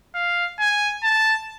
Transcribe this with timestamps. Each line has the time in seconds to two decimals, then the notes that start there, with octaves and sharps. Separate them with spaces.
0.15 F5
0.59 G#5
1.03 A5